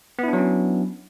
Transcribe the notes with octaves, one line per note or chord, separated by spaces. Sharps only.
F#3 B3 C#4 D4 E4